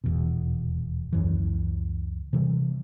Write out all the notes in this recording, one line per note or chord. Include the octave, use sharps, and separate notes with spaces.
D#1 E2 B2
C#2 F#2 E3
C3 E3 F3 G3